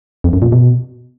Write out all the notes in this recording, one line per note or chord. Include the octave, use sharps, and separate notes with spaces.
F2
F#2
A#2
B2